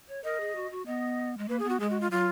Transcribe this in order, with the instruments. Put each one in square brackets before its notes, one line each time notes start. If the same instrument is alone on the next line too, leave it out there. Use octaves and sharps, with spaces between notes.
[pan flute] C#5
[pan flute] A#4 [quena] D#5
[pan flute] G#4
F#4
F#4
[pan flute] B3 [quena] D#5
[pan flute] G#3
[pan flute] A#3 [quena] B4
[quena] G#4
[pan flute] B3
[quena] F#4
[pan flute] G#3 [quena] G#4
[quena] F#4
F4
[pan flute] F#3 [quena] F4